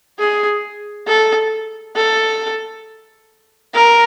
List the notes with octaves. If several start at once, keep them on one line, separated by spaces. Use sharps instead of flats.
G#4
A4
A4
A#4